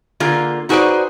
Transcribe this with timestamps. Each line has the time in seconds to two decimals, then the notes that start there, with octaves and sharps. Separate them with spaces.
0.20 D3 A#3 F4 G#4
0.69 D#4 F#4 G#4 B4 C5 D5